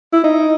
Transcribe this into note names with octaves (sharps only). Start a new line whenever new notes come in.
E4
D#4